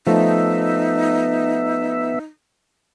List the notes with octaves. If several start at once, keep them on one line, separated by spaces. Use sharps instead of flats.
F3 A3 B3 D#4 A4 E5